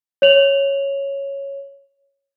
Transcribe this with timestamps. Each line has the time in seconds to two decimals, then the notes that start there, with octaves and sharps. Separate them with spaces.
0.22 C#5 F7 F#7